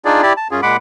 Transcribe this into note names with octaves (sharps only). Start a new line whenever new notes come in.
D4 D#4 F4 G#4 D5
E4 G4 D5
A5
F#2 C#4 F4 G#4
A#2 G#3 F#5 B5 D6